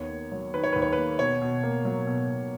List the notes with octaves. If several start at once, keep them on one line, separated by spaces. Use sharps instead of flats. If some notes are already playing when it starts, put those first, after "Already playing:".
Already playing: D#2 B3 C#5
A#3
F#3
D#3 B4
C#5
D#2 B4
C#5
A#3 B4
B2 C#5
B2
A#3
F#3
B2
B2